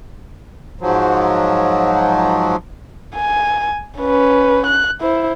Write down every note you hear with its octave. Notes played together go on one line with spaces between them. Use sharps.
G#2 F3 F#3
G#5
C#4 B4
F#6
E4 C5